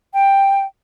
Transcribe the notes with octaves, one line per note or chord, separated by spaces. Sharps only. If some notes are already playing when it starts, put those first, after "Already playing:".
G5